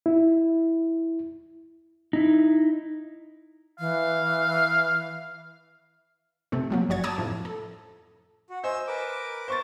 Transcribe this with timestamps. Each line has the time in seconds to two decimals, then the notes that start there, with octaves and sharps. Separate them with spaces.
0.06 E4
2.13 D#4 E4
3.79 E3 F5
6.52 C3 A3 C4
6.70 F3 F#3 A#3
6.89 G1 C#4 F#4 C#5 G#6
7.04 A5 A#5 D6 D#6 G#6
7.18 F2 A2 C3
7.45 A4
8.50 F#4
8.64 C5 D#5 G#5 E6
8.87 A#4 B4 D6
9.48 C5 C#6 A6